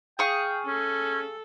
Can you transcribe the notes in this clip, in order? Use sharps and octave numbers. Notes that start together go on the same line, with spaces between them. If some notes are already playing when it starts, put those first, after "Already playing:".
G#4 F5 G5 C#6
C#4 A4